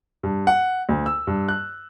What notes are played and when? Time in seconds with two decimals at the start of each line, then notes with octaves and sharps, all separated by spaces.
0.23 G2
0.47 F#5
0.89 D2
1.06 E6
1.27 G2
1.48 F#6